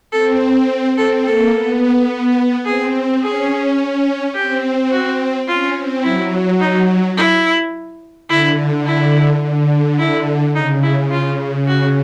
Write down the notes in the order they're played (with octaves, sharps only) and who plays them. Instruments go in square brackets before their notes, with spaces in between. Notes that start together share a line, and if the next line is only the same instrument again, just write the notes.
[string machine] C4 [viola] A4
[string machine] C4 [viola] A4
[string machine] A#3 [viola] A4
[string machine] B3
[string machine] C4 [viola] G#4
[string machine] C#4 [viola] G#4
[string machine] C4 [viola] G4
[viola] F#4
[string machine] C#4 [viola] F4
[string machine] C4
[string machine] F#3 [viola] E4
[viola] D#4
E4
[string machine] D3 [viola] E4
[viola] E4
[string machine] D3
[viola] E4
[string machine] C#3 [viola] D#4
[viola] E4
F4
F#4